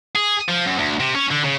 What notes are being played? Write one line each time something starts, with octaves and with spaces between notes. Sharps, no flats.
G#4
F3
F#2
D2
C3
C#4
D3
C#3